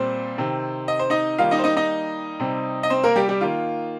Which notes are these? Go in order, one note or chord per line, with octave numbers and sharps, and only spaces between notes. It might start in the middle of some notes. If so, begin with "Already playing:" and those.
Already playing: A#2 G3 C4 C5
C3 D#3 C4
D#5
C5
D#4 D#5
D#3 G3 A#3 F4 F5
D#4 D#5
C5
D#4 D#5
D#4 D#5
C3 G3 C4
D#5
C4 C5
A#3 A#4
G3 G4
G3 G4
D#3 A#3 F4